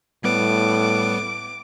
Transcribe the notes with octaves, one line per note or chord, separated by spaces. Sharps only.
A2 G3 B3 B4 D6